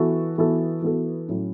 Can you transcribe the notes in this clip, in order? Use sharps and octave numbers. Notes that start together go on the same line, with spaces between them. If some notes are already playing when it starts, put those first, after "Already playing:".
Already playing: E3 B3 F#4 A4
E3 B3 F#4 A4
E3 B3 F#4 A4
A2 F#3 C#4